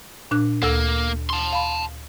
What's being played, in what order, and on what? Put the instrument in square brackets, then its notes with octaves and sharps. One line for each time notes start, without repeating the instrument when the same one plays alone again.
[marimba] A#2 D4 F#6
[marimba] D2 A4 E6 [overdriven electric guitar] A#3
[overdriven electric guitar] A5 C6
[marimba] F5 B5